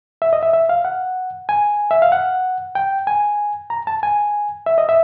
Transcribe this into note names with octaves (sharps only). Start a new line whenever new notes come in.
E5
D#5
E5
E5
F5
F#5
G#5
E5
F5
F#5
G5
G#5
A#5
A5
G#5
E5
D#5
E5